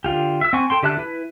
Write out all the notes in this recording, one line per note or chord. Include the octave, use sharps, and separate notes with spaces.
D3 F4 G4
E5 E6
C4 F#5 G#5 C#6
A4 G5 C6
D3 G4 E5 A5 F#6
E4 B4